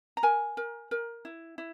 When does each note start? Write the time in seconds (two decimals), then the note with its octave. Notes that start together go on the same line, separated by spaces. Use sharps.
0.17 A#5
0.23 A#4 G#5
0.57 A#4
0.91 A#4
1.25 E4
1.58 E4